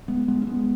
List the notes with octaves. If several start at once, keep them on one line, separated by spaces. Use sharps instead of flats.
G#3 B3
G#3 B3
C#4
G#3 B3